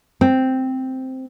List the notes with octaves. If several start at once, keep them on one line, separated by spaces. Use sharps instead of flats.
C4